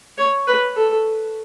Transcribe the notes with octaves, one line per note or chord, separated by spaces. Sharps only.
C#5
B4
A4